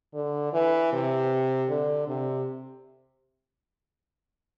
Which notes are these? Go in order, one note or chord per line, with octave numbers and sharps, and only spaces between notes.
D3
E3
C3
D3
C3